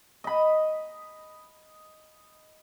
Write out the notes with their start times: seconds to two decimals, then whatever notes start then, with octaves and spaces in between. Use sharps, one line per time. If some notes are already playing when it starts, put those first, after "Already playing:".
0.24 D#5 B5